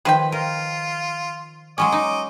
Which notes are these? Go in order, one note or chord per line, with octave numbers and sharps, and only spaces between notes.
D#3 F3 G#4 B4 C5 G5
F4 A#4
F#3 G#3 C#4 D#5 D6
D#4